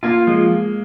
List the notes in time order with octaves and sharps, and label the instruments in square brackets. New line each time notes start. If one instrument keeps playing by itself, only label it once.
[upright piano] A#3 [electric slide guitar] F4
[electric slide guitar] F3 [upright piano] G#3